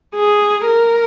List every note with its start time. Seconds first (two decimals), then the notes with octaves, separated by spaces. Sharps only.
0.15 G#4
0.67 A#4